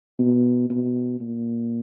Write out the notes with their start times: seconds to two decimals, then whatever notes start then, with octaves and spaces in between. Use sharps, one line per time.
0.19 B2
0.70 B2
1.21 A#2